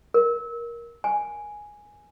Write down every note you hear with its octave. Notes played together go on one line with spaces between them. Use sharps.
A#4
G#5